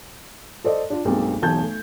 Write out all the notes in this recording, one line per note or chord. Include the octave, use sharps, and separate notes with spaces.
A4 C5 D5 D#5
D4 F4
B1 G2 G#3 A#3 C4 G4
E1 B1 A5 G6 G#6
A3